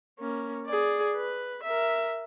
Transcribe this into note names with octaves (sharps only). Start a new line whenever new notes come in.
A#3 C#4
G#4 D5
B4
A#4 E5